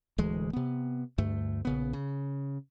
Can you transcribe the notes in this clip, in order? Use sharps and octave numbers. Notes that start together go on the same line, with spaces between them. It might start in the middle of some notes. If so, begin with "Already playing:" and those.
D1 D2 E3 G#3
C3 B3
D2 G2 A3
A#1 C#3 B3
C#3